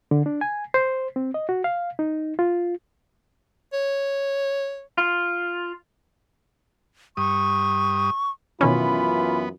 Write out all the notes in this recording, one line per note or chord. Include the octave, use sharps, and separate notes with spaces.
D3
D4
G#5
C5
C4
D#5
F#4
F5
D#4
F4
C#5
F4
G2 C#6 D#6
F#2 B2 D#3 E3 B3 C#4 F4 B5